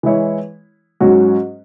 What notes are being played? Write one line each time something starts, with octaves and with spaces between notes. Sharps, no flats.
E3 G#3 E4 C#5
G#2 F#3 C#4 F#4